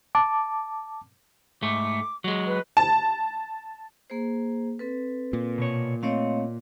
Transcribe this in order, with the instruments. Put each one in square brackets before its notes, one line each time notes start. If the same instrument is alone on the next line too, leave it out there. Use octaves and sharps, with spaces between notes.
[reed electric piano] A5 D6
[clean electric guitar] G#2 A3 [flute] D6
[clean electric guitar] F#3 G#3
[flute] B4
[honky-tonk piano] A5
[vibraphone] A#3 G#4 C5
C4 A4 B4
[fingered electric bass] A#2
[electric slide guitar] B2 C#5
[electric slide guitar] A3 C4 [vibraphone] C#5 D#5 F5